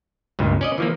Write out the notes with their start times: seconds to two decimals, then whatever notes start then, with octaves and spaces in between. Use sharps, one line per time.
0.39 C#2 G2 A#2
0.61 C#4 D5 D#5
0.78 E3 F3 A#3